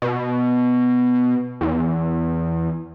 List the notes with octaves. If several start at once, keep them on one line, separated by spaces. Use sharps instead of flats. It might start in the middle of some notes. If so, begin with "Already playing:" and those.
B2
E2